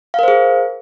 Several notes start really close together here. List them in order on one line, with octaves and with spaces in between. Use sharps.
F5 A#4 C5 G#4